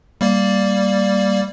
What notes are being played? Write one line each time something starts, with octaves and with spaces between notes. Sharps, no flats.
G3 A#3 D5